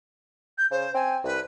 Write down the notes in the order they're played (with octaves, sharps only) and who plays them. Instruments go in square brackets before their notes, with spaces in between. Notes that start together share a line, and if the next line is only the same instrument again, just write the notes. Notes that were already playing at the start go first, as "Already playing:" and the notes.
[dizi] G6
[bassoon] C#3 [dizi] C5
[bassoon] C4 [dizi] G#5
[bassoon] C2 [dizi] B4